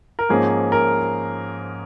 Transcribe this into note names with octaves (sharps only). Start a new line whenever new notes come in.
A#4
G#2 F3 A#3 C#4 G#4
A#4